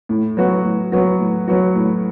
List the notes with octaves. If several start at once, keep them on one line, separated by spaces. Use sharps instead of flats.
A2
F#3 B3 F#4
A2
F#3 B3 F#4
A2
F#3 B3 F#4
A2